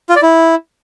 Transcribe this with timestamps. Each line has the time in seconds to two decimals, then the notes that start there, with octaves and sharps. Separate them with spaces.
0.10 F4
0.16 D5
0.22 E4